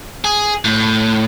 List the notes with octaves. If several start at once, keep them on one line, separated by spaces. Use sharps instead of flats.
G#4
A2